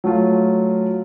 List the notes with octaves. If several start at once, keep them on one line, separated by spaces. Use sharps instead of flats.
F#3 A3 F4